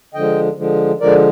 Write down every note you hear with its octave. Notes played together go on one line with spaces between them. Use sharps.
D3 F3 G#3 D#5 G5
D3 F3 G#3
D3 F3 G#3 A#4 D5